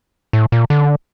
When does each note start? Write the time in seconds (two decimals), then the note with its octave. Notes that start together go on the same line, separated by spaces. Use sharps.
0.33 A2
0.52 A#2
0.70 D3